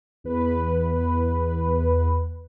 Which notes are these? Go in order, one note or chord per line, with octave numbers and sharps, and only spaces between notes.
E2 B4